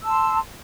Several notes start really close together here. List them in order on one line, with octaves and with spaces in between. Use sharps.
E6 A5 C6